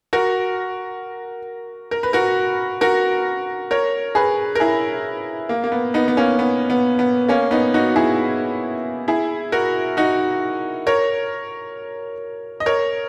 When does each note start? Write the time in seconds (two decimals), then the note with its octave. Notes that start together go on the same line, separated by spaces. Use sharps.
0.13 F#4 A#4
1.91 A#4
2.03 B4
2.13 F#4 A#4
2.81 F#4 A#4
3.71 A#4 C#5
4.15 G#4 B4
4.55 A#4
4.60 E4 G#4
5.49 A#3
5.64 A#3
5.72 B3
5.94 B3 D#4
6.08 B3
6.17 A#3 C#4
6.39 B3
6.70 B3
6.99 B3
7.28 A#3 C#4
7.51 B3 D#4
7.74 D#4 F#4
7.96 E4 G#4
9.08 E4 G#4
9.52 F#4 A#4
9.97 D#4 F#4
10.87 A#4 C#5
12.60 D#5
12.66 A#4 C#5